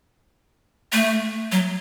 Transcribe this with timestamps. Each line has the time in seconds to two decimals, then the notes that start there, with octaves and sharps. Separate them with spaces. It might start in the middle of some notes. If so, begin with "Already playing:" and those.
0.93 A3
1.52 F#3